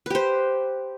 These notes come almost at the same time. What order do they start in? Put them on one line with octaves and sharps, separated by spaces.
B4 G4 C5